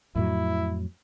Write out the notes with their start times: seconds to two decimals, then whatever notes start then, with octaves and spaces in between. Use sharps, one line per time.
0.15 F2 A2 F#3 E4